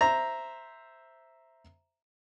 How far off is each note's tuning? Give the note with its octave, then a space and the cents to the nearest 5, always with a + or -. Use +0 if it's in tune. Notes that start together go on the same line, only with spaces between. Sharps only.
C5 +0 E5 +0 A#5 +0